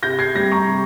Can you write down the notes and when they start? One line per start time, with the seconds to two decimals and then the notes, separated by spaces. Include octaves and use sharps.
0.03 C3 G6 A#6
0.19 G#6 C7
0.35 G3 C4 G6 A#6
0.51 A#5 C#6
0.67 C3